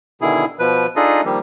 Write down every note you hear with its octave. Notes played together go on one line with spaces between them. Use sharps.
B2 D3 D#3 E4 G#4
B2 F3 B4
D4 D#4 F4 G#4 A4 D#5
D#3 F3 G3 A#3 G4